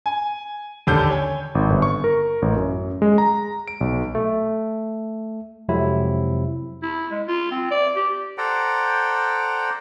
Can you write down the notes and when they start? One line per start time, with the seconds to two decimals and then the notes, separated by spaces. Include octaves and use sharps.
0.06 G#5
0.87 A1 D#2 D3 G4 A4 G6
1.10 C#5 G#5
1.55 G#1
1.70 G1
1.82 C#6
2.04 A#4
2.42 A1
2.56 F#2
3.02 G#3
3.18 A#5
3.68 D7
3.81 B1
4.15 A3
5.69 F2 C3 F#3 G#3 E4
6.82 E4
7.12 G#3
7.28 F4
7.51 C4
7.71 D5
7.96 G4
8.38 A4 C5 D5 F#5 G5 A#5